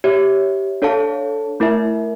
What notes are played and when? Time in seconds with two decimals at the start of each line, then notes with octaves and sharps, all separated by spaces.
0.04 G4 C#5 E5
0.82 D4 A4 C#5 F5 A5
1.60 A3 E4 A#4 E5